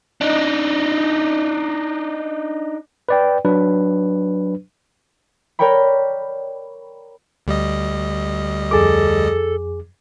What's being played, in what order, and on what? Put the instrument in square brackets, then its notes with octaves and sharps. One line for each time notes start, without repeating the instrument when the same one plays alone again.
[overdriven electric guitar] D4 D#4
[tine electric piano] B4 D5 G5
F#3 D4 B4
[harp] A#4 C#5 D5 G5 B5
[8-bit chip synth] D2 G3 D#5
[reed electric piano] F2 G#4 D6 [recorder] A4